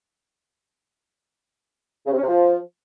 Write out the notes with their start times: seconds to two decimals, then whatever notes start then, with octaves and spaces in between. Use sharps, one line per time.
2.06 C#3
2.12 C3
2.17 C#4
2.23 C3
2.28 F3